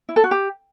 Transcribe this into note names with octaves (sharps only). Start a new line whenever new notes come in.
E4
A4
F#4
G4